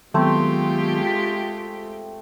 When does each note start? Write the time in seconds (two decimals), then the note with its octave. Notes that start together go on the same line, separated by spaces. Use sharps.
0.14 D#3 F#3 G#3 A3 B3 C4 F4 G4
1.07 B6